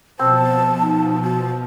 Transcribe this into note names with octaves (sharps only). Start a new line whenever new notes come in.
B2 F3 C4 C5 A5
D#4
F#4 A5